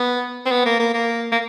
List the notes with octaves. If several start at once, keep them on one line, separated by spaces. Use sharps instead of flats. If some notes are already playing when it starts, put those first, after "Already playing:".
Already playing: B3
C4
B3
A#3
A#3
A#3
A#3